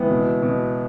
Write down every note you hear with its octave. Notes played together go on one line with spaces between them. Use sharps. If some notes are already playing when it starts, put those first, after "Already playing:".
Already playing: C#2 E3 B3
B2
B2